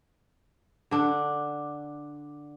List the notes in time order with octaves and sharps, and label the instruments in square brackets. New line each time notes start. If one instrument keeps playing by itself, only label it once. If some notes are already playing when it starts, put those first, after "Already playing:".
[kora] D3 D4